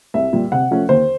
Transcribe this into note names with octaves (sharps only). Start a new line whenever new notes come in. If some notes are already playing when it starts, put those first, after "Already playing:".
C2 E5
A#2 G3
C3 F#5
F3 A3 C#4
D#2 C5